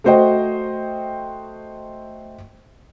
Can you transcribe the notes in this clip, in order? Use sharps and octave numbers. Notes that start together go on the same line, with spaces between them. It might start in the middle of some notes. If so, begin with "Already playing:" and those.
A3 F#4 C5 D#5 G5